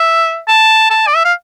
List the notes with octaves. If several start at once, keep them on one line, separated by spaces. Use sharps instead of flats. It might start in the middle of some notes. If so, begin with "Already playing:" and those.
Already playing: E5
A5
A5
D5
E5
F5